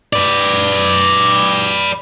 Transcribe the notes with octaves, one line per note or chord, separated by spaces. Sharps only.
B4 D5